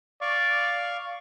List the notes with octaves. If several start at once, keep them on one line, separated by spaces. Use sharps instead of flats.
D5 F5 C#6